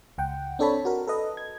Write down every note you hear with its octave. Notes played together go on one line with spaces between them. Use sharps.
C#2 F#5 G5
C4 D4 A4 C#5 A5 B5
F#4 A#4
A4 B4 D#5
G#6